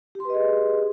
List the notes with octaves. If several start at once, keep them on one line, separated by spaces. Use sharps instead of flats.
G4 G#4 B4 D#5 C6